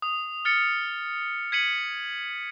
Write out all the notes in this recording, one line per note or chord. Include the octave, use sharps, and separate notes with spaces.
D#6
F6 A6 C#7
G#6 B6 C#7 D#7 F#7